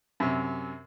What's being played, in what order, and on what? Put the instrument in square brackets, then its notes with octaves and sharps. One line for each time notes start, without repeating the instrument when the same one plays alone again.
[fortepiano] F#2 C3